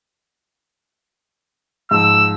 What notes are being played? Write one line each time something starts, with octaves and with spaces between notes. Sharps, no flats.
G#2 F3 E6